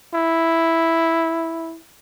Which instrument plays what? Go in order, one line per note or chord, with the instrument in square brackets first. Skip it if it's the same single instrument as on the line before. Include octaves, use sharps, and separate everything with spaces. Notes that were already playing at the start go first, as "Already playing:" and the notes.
[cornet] E4